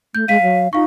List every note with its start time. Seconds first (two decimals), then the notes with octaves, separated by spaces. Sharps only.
0.15 A3 G6
0.28 G#3 F5 B6 D#7
0.42 F#3
0.73 D#4 F4 F5 C#6